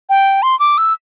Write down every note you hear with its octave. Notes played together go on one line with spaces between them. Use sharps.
G5
C6
D6
E6